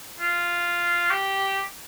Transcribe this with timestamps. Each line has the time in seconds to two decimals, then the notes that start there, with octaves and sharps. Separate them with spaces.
0.20 F4
1.10 G4